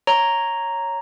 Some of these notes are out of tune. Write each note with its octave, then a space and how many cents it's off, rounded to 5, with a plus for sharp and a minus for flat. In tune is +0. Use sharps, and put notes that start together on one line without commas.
C#5 +0 A#5 +0